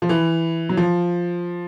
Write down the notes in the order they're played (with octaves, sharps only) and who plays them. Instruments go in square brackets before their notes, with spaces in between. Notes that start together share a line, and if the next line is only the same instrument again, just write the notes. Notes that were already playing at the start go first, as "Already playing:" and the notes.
[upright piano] F3
E3
F#3
F3